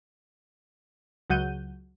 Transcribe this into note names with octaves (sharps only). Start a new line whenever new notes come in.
C#2 F#3 F#5 G6 D#7